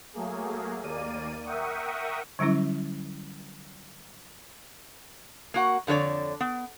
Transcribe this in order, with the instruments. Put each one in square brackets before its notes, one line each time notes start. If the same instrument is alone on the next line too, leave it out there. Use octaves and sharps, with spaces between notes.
[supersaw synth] F#3 A3 A#3 G#4
D#2 A#3 D5 D#7
A#4 E5 F#5 G5 C#6 D#6
[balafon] D3 F#3 G3 C#4 E4
[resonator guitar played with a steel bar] A#3 F#4 F#5
F2 D3 G#3 C#5 D5
B3